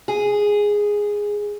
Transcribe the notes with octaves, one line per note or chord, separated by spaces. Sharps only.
G#4